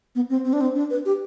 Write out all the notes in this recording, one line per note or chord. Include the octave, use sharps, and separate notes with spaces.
B3
C4
C4
D4
C4
D4
B4
G4